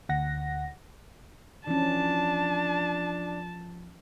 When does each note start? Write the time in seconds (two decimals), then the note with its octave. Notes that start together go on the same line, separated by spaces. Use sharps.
0.09 D2 F#5 A#6
1.67 E3 F3 C#4 D4 A5